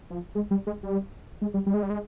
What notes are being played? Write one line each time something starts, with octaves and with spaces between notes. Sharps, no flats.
F3
G#3
G3
G#3
G3
G#3
G3
G3
G#3
G3
G#3